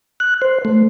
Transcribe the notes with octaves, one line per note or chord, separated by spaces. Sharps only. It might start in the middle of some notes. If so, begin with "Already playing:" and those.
F#6
C5
A3